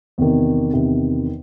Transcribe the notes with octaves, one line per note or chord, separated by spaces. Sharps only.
E2 C3 D#3
E2 C3 D#3